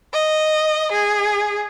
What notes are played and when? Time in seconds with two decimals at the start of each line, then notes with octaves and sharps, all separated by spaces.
0.13 D#5
0.92 G#4